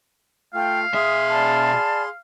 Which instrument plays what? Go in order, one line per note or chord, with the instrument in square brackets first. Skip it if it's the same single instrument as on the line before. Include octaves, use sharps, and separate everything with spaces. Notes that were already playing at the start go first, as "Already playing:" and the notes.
[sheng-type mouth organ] A3 F4 [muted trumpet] F5 [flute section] G5
[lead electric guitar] B2 E5 [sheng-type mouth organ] G#4 C6 [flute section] D#6
[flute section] D5 A5 B5